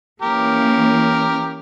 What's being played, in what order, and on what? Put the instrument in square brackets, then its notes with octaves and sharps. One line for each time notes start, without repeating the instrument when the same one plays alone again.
[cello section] E3 A#3 C#4 [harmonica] G4 A#4